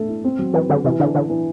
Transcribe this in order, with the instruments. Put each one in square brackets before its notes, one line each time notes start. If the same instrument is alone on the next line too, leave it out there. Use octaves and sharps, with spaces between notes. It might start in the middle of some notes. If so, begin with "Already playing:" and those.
Already playing: [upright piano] A3 D4 A4
E4
C4
F#3
[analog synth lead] E3 [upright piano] B4
[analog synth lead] D3 [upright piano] F#3
[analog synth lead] C3 [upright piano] E3
[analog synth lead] D3 [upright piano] D4
[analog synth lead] D3 [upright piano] E3
[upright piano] E3